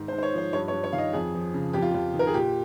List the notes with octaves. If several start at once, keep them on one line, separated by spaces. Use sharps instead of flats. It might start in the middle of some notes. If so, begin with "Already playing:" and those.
Already playing: G#2 D#3
C5
G#2
C5
C#5
F3 C5
G2 C#5
C#5
G2
C#5
D#3 F5
D#5
F2 G#4
F3
C#3
F2 G4
F4
F2 G4
D#3
A#4
G#4
A#2 G4